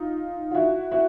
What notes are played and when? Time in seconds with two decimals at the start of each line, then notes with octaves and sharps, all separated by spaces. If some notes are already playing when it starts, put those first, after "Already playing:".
Already playing: D#4 F4
0.51 F4
0.55 E4 F#4
0.91 E4 F#4